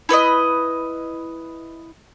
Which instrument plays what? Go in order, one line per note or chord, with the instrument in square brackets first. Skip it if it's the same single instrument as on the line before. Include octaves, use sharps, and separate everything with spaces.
[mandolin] E4 B4 C#5 D#5